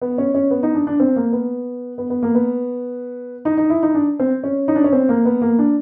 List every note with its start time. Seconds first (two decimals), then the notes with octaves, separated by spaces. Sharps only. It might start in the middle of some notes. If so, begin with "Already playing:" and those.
0.01 B3
0.18 C#4
0.35 C#4
0.51 B3
0.63 D#4
0.75 D4
0.87 D4
1.00 C4
1.16 A#3
1.33 B3
1.98 B3
2.10 B3
2.23 A#3
2.35 B3
3.45 D#4
3.57 D#4
3.70 E4
3.83 D#4
3.95 D4
4.19 C4
4.44 C#4
4.68 D#4
4.76 D4
4.84 C#4
4.93 C4
5.09 A#3
5.25 B3
5.42 A#3
5.59 D4